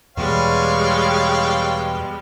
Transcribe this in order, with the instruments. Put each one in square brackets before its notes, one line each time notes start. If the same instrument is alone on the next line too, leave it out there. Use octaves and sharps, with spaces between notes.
[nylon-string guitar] E2 B2 [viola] G3 G#3 [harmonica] C#5 F5 G5